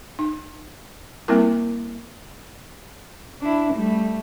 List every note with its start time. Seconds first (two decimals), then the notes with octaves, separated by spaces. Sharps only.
0.19 D#4
1.28 G3 A#3 C4 E4 A#4
3.41 D4 E4
3.73 G3 A3